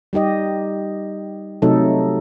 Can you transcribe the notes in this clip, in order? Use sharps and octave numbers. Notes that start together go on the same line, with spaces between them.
G3 D#4 G4 D#5
C3 F#3 A3 D#4 A4